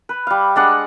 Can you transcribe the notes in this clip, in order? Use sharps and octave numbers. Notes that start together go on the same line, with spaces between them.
B4
G3 F5
G#3 D4 F#5